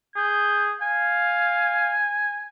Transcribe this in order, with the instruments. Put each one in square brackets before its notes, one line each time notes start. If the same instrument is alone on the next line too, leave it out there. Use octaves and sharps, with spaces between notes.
[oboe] G#4 [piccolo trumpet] G6
[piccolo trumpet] F5 [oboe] G#5